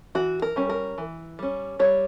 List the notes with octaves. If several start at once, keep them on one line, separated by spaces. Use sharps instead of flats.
E3 F#4
A#4
G3 C#4
A#4
E3
G3 C#4
G3 C#5